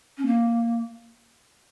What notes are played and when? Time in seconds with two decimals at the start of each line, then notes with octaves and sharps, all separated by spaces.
0.17 C#4
0.26 A#3